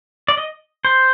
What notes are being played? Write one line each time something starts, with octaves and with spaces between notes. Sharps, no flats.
D5
D#5
C5